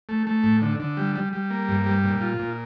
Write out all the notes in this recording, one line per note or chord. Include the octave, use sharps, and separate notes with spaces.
A3
A3
A2
D3
D3
G3
G3
G3
A#3
G2
G3
A#2
F4
A#2